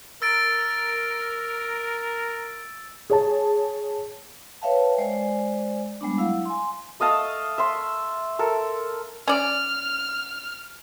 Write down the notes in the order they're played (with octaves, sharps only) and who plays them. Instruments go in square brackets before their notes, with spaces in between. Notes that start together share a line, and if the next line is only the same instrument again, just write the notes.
[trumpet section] A#4 [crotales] E6 A6 D7
[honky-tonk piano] G#4 C#5 A5
[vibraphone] B4 C#5 E5 F5 G5 A5
G#3 C5 D5 G#5
G3 G#3 B3 D4
F#3 E4 F5
G#5 C6
[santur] A3 D#5 F5 A5
E5 C6
A4 A#4
[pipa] C#4 D5 [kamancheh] F6